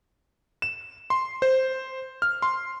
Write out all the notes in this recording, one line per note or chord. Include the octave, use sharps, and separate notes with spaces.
E7
C6
C5
F6
C6